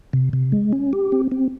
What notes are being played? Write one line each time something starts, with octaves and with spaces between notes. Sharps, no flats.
C3
C3
G#3
C#4
G4
C4
C4